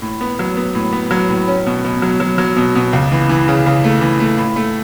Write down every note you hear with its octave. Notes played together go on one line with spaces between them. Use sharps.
A2
B3
F#3
B3
A2
B3
F#3
A2
C#4
B2
B2
F#3
F#3
F#3
B2
B2
C#2
E3
E3
C#3
C#3
A3
E3
A3
A2
A3